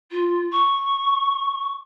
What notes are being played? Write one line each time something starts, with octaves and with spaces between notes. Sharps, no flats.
F4
C#6